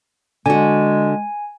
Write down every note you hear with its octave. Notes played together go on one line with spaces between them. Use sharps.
D3 G#3 F#4 G#5